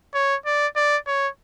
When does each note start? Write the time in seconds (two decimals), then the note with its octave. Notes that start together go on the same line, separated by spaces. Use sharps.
0.14 C#5
0.46 D5
0.76 D5
1.07 C#5